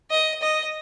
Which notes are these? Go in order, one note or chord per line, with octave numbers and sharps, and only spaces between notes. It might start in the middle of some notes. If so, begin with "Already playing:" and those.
D#5
D#5